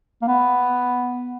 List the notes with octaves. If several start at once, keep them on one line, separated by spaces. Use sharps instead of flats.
A#3
B3